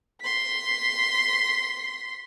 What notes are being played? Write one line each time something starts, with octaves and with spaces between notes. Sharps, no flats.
C6 B6